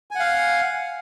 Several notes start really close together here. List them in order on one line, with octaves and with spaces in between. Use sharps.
G#5 F#5 F5